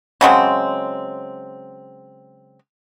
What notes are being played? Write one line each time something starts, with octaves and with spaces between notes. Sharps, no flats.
C#3 F#3 G#3 C4